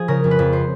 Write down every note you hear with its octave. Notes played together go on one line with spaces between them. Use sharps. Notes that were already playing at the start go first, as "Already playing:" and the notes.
Already playing: F3 G#4
C#3 A#4
F2
B4
F2
C5